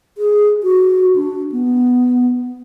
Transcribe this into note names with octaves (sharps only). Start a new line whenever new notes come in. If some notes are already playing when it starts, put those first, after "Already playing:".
G#4
F#4
D4
B3